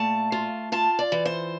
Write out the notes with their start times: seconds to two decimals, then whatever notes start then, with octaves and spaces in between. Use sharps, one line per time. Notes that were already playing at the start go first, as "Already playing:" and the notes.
Already playing: A#2 A3 A5
0.32 F4
0.72 F4 A5
0.99 D5
1.12 E3
1.26 C5